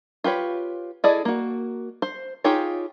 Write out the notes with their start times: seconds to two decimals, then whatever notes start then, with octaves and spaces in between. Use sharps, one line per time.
0.24 F4 G4 B4 C#5
1.04 E4 G#4 A4 D5 D#5
1.25 A#3 F#4
2.02 C5
2.44 D#4 F4 G4 G#4 C#5